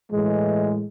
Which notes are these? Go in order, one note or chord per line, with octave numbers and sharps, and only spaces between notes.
A2 E3 G#3